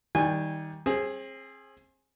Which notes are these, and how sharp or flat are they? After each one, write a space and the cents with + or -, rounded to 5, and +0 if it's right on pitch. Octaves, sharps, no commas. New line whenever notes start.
D#3 +20 G3 +0 G#5 -15
C4 +35 G#4 +0